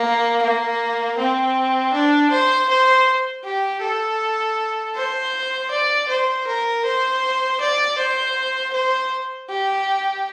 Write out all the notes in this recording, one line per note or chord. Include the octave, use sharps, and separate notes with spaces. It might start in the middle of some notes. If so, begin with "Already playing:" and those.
Already playing: A#3
A#3
C4
D4
C5
C5
G4
A4
C5
D5
C5
A#4
C5
D5
C5
C5
G4